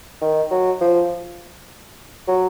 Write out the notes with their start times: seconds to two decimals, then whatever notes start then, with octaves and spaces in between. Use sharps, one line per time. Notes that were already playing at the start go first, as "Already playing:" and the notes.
0.22 D#3
0.51 F#3
0.81 F3
2.28 F#3